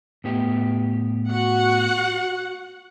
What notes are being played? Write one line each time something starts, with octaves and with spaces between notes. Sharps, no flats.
A2 B3 G4
F#4 F#5